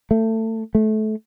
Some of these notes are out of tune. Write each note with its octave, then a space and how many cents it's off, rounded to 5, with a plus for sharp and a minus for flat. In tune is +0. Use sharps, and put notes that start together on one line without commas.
A3 +25
A3 -25